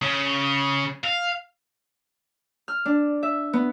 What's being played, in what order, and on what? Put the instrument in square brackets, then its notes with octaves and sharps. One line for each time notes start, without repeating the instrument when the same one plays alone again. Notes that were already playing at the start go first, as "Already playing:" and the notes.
[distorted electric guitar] C#3
F5
[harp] F6
D4
E5
B3